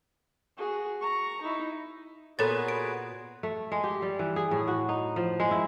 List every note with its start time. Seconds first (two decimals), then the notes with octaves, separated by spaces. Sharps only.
0.57 F#4 G#4
1.01 A#5 C#6
1.41 D#4 E4
2.39 A#2 B3 F#4 G#4 A4 B4 C#5 A6
2.68 D7
3.43 A3
3.72 G#3
3.84 G4
4.02 G3
4.19 E3
4.36 G#4
4.51 A2
4.68 F#4
4.89 D#4
5.16 F3
5.40 G#3
5.51 E4